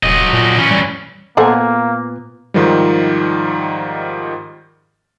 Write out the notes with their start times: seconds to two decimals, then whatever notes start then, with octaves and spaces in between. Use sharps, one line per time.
0.03 D#1 F#3 D#5
0.33 A#2
0.58 E3 C#4
0.71 G3
1.37 A#2 A#3 B3 A4 C5 F#5 G#5
2.54 G#2 D#3 F3 G3